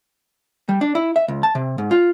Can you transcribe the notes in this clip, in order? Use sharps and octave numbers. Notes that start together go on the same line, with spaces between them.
G3
D4
E4
E5
C#2
A5
C3
G#2
F4